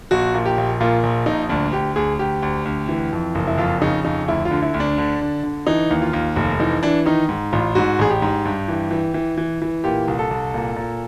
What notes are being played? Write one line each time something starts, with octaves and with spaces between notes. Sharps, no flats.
A#1 F#4
A#2
G4
A#1
A#2 F4
A#1
A#1 D#4
D2 D4
D2 G4
D2 G#4
D2 G4
D2
D2
E3
F2
F#1
E4
F2 F4
C#3 D#4
F2 D#4
D2 E4
F4
D3
E4
D2
D4
D3
D3
D3
E3 D#4
D#2
F4
D#2
F1
E3 D#4
E3 D4
D#3 D#4
G#2
A1 F4
G#2 F#4
A1 G#4
G4
G#2
G2
E3
E3
E3
E3
E3
A#2 G4
C2
A4
C2
A#2
A#2